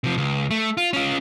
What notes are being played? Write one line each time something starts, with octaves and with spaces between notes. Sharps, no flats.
C3 F3
C#2
A3
F4
C#4 F4